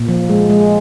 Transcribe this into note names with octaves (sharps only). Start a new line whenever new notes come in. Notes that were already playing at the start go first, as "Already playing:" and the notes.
Already playing: A#2
F3
G#3
G#3